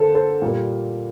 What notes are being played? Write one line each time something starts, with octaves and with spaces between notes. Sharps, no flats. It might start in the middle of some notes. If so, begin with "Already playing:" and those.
Already playing: D3 A#3 A4 C5
A4 C5
A#2 G3 A#3